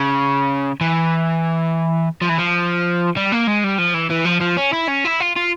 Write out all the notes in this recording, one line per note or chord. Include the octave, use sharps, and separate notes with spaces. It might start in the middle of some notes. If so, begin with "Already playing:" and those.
Already playing: C#3
E3
F3
E3
F3
G3
A#3
G#3
G3
F3
E3
E3
F3
F3
C#4
E4
C#4
E4
F4
F4